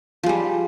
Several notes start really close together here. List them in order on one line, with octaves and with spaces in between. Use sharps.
F3 G#3 G3